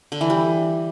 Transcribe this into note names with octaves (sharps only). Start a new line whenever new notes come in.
D3
E3
G3